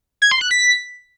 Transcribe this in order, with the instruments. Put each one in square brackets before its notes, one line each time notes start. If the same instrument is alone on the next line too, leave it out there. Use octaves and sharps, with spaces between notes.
[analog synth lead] G#6
C6
F#6
B6